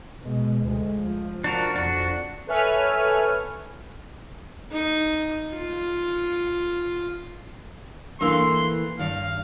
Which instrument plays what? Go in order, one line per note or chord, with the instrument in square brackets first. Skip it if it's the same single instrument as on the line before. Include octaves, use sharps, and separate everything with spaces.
[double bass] B2 G#3
D2 G#3
F3
[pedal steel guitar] D4 F#4 A#4
[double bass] F2 [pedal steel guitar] D4 F#4
[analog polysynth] A4 B4 C#5 E5 G#5 F6
[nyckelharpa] D#4
F4
[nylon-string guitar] E3 A3 A#3 [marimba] D4 F5 E6 [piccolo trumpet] C6
[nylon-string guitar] G2 [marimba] D#3 [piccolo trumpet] F5